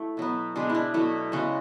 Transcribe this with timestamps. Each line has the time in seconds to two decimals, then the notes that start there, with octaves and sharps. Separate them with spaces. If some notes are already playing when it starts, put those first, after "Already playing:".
Already playing: A3 E4
0.17 B2 F#3 B3
0.56 B2 G#3 B3 D4
0.70 E4
0.75 D4
0.94 B2 F#3 A3 E4
1.32 C#3 G#3 B3 F#4